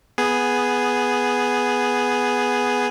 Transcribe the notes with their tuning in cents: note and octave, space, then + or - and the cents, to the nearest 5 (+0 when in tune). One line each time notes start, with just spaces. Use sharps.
B3 +0 G#4 +0